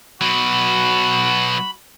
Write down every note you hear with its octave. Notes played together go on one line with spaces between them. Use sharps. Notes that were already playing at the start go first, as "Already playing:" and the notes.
B2 F#3 F#4 B5